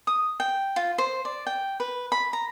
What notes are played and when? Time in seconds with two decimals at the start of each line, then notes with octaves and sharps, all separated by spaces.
0.07 D#6
0.40 G5
0.76 F4
0.98 C5
1.25 D5
1.47 G5
1.80 B4
2.12 B5
2.33 A#5